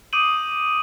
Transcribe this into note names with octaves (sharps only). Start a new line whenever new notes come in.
D6 D#6 G6 D7 D#7 F#7